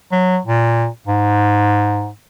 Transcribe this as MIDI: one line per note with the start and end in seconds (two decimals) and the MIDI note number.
0.12 0.38 54
0.45 0.87 46
1.07 2.09 44